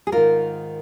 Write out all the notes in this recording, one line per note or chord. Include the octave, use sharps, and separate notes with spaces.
G#4
G#2 D#3 F4 A#4